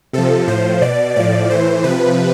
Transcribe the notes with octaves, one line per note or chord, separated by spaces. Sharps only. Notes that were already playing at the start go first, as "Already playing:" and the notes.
C3 F3 A4
A2 F3 C5
B2 D5
A2 F3 D5
A2 E3 C5
C3 F3 B4